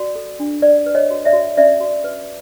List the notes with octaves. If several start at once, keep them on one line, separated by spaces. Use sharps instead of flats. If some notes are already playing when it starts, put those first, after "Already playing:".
Already playing: F#4 D5
A4
D4
B4 D5
B4
C#5 D#5
F#4
D5 E5
F#4
C#4 D5 E5
F#4
B4